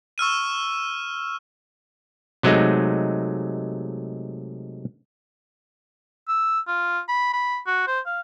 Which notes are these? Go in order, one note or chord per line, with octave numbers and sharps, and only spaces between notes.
C#6 E6 F6 D#7
C3 F#3 G#3 A3 D#4
E6
F4
B5
B5
F#4
C5
F5